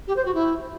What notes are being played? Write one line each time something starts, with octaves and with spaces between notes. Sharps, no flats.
G4
C5
F#4
E4